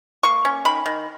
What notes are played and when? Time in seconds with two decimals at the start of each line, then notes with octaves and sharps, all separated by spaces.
0.23 A#3 C#6
0.45 C#4
0.65 D#3 B5
0.86 D#3